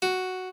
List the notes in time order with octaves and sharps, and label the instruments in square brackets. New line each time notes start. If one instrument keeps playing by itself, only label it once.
[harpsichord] F#4